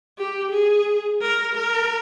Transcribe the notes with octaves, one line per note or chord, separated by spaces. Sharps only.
G4
G#4
A#4
A#4